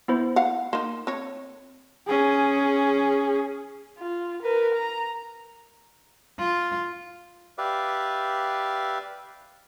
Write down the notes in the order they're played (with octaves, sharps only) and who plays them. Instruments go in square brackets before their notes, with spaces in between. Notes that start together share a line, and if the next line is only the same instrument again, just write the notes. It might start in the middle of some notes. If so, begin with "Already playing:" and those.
[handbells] B3 E4 C5
[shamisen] F5 F#5
[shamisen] A#3 D#4 [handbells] C6
[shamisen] C4 C#5
[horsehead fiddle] C#4 G#4
[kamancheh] F4
A#4 B4
A#5
[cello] F4
[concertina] G4 B4 D5 E5 F5